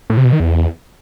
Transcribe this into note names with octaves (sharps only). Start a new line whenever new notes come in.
A2
C3
B2
D#3
E2